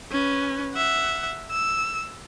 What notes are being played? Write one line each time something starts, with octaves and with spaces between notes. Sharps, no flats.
C#4 B4
E5 F#5
E6